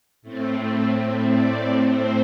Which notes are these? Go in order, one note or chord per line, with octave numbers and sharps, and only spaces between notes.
A2 A3 C4
D5
C5